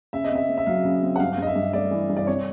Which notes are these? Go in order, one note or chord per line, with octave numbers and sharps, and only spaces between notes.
C#3 E5
D#5
C4 E5
C4
E5
F#3 F5
C#3
C4
F#5
G2 F5
G2 D#5
E5
G2
A3 D5
E3
G2
D5
C3 C#5